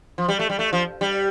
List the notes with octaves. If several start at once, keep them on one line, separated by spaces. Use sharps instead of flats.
F3
G3
A3
G3
A3
F3
G3